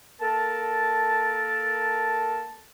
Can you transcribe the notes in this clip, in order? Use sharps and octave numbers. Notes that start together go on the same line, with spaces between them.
A#3 A4 A#4 A5